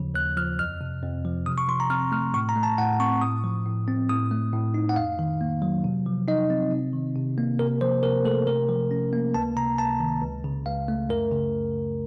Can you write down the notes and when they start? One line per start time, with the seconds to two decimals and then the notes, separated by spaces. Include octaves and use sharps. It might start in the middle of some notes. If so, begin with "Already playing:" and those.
Already playing: D#2 C#3 F3
0.15 D#2 F#6
0.37 F3 F6
0.59 F2 F6
0.81 C3
1.03 F2
1.25 F3
1.46 C3 D#6
1.58 C#6
1.68 F3 C6
1.80 A#5
1.90 C4 F6
2.12 A3 F6
2.34 A2 C#6
2.49 A#5
2.56 A3
2.63 A5
2.78 A2 F#5
3.00 C4 C#6
3.21 A2 D#6
3.44 F3
3.66 A2
3.88 C4
4.09 A2 D#6
4.31 A3
4.53 A2
4.74 D#4
4.89 F#5
4.96 F2 F5
5.19 D#3
5.41 A#3
5.62 F#3
5.84 C3
6.06 F3
6.28 D#4 D#5
6.50 C4
6.72 C3
6.93 D#3
7.15 C3
7.38 A#3
7.59 C3 A#4
7.81 F3 C5
8.03 C3 A#4
8.25 A3 A4
8.47 C3 A#4
8.69 F3
8.91 C#4
9.13 A#3
9.34 C#2 A5
9.57 C3 A#5
9.78 C#2 A5
10.00 D#3
10.22 C#2
10.44 C#3
10.66 C#2 F5
10.88 A3
11.09 F#2 A#4
11.31 C#3